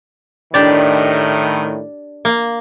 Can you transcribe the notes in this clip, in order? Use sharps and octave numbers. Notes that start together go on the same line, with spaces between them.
A2 D#3 D4 G4 D5
A#3